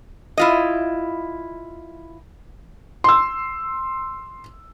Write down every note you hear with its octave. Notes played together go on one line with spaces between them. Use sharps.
E4 F4 D#5
C6 E6